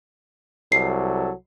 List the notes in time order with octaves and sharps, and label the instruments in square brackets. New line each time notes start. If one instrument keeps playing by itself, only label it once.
[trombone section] C2 F#3 A4 [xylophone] C7